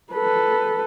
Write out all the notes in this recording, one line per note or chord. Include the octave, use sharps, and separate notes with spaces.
A4 B4